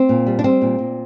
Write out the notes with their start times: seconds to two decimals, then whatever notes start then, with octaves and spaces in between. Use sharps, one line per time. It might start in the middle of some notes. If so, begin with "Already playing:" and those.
Already playing: C4
0.09 A#2
0.27 G3
0.39 D4
0.44 G3 C4
0.62 A#2
0.79 A#2